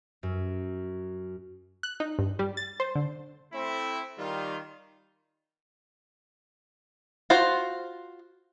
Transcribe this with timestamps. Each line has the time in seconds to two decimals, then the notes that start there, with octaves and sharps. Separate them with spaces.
0.23 F#2
1.83 F#6
2.00 D#4
2.19 G2
2.39 G3
2.57 A6
2.80 C5
2.95 D3
3.53 A3 C4 E4
4.18 D#3 G3 F4
7.30 F4 F#4 C5